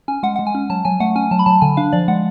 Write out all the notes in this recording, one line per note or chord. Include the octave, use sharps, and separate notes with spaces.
C#4 G#5
G#3 F#5
G#3 F#5
G#5
C#4
F#3 A5
F#3 G#5
A3 F#5
C#4 G#5
F#3 A5
B5
F#3 A5
D3 G#5
D4 F5
F3 D5
G#3 F#5